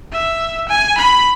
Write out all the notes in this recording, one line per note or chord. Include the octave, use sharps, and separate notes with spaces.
E5
G#5
B5